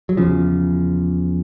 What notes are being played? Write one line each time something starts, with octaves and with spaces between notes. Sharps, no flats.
F#3
E2 C#3 F3